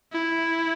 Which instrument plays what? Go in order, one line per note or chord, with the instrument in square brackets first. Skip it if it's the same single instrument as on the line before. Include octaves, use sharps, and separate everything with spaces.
[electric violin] E4